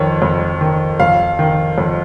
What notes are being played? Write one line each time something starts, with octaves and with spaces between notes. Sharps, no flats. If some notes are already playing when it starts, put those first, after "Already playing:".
Already playing: F2 D#3 C#5
F2
D#3
F2 F5
D#3
F2